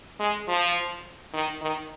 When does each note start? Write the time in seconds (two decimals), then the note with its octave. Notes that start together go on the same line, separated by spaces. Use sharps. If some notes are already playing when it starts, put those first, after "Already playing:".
0.20 G#3
0.48 F3
1.33 D#3
1.61 D#3